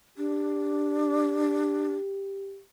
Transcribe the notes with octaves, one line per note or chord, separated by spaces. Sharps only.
D4 G4